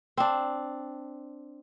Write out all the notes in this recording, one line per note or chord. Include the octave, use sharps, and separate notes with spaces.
C4 D4